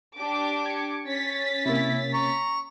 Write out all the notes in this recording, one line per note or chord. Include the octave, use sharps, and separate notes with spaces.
D4 G4 D6
G#6 C#7
C#4 A6 B6
C3 A#3 E4
A#5 C#6